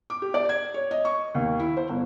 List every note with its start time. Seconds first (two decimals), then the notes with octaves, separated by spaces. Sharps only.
0.10 D6
0.22 G4
0.34 D5
0.49 G#6
0.74 C#5
0.91 D#5
1.05 C#6
1.35 D#2
1.59 E4
1.77 C5
1.89 G1